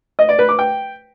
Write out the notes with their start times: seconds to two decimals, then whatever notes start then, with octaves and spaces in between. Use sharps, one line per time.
0.19 D#5
0.29 D5
0.39 B4
0.49 D6
0.59 G5